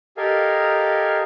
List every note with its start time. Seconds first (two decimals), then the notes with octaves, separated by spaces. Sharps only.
0.17 G4 A4 A#4 D#5 F5 G#5